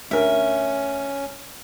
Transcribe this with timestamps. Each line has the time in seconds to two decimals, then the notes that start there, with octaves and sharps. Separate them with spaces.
0.11 D2 C#4 A#4 E5